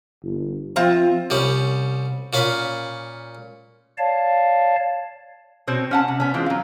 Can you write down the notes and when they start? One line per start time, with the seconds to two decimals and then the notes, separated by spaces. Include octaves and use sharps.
0.23 G1
0.76 F3 C4 F4 E5
1.30 C2 G3 C#4
2.33 A#2 C#4 F5 B5
3.98 C#5 D5 F5 A5
5.67 B2 C4 C5 C#5
5.91 C#4 F#5 A5
6.08 C3
6.20 B3 C#4
6.34 E3 G#3 C4 F4
6.46 F#3 F5